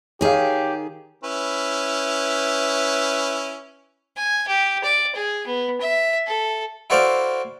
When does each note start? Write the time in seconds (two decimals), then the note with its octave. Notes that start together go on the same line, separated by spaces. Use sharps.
0.21 D#3 G4 G#4 C#5 F5
1.24 C#4 E4 B4
4.17 G#5
4.48 G4
4.84 D5
5.15 G#4
5.46 B3
5.81 E5
6.27 A4
6.90 E4 F#4 A4 C5 D5 F5